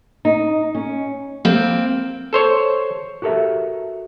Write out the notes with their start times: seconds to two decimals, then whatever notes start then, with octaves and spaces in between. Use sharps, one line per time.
0.25 D#4
0.75 C#4
1.45 A#3 C4
2.33 A4 C5 C#5
3.22 F#4 G4 A4 A#4 E5